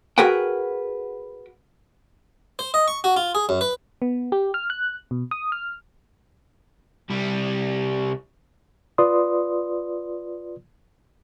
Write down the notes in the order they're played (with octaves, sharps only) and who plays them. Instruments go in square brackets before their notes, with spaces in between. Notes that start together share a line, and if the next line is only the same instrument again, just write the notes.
[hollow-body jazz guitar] F#4 G#4 A#4 B4 F#5 G5
[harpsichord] C5
D#5
C#6
F#4
F4
G#4
F#2
B4
[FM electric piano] B3
G4
F6
F#6
B2
D#6
F6
[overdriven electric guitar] C2 G3
[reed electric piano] F4 B4 D5 C6 D#6